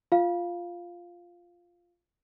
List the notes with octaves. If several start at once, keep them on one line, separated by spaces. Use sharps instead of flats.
F4 F5